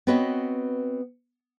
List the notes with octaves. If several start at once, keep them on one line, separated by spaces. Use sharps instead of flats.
B3 C4 F#4 B4 C#5 D#5